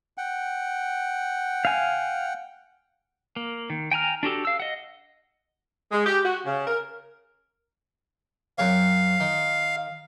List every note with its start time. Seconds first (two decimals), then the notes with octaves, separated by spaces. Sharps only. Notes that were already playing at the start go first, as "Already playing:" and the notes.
0.18 F#5 G5
1.65 F5 G#5
3.36 A#3
3.70 D#3
3.91 G5 G#5 A#5 F6
4.23 D4 F#4 G4 A4
4.45 F5 E6
4.60 D#5 F#5
5.92 G#3
6.06 G4
6.24 F#4
6.45 C#3
6.67 A#4
8.58 F#2 C4 C#5 F5
9.20 D#3